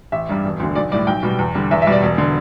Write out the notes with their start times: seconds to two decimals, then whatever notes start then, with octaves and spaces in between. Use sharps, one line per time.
0.12 A1 E5
0.29 G2 G3
0.45 E1
0.60 D2 D3
0.75 B1 D5
0.91 A2 G3 D5
1.07 B1 G5
1.23 B2 G3
1.39 E2
1.55 D3 G3
1.71 E2 E5
1.82 E5
1.87 B2 G3
1.92 D5
2.02 E1
2.18 D3